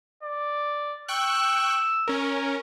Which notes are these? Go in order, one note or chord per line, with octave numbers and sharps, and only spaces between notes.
D5
G5 C#6 E6 F#6
C#4 A#4